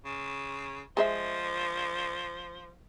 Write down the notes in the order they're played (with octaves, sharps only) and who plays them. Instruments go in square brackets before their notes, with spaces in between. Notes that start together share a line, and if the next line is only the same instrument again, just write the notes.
[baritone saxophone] C#3
[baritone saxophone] F3 [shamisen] G#3 C5 E5